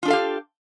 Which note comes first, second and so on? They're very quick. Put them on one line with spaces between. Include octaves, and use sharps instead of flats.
F4 D4 A4 F5 G4